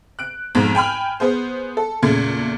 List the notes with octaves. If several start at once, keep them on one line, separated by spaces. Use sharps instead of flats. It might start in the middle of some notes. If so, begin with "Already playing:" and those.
F#6 D7
B1 F2 G#2
G5 G#5 B5 F6
B3 G#4 C5
A4
E2 A#2 C#3 A3 G#6